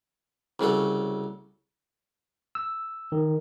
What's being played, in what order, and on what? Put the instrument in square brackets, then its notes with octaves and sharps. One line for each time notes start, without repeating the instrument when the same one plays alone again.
[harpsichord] C2 C#3 F#3 A4
[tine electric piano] E6
D#3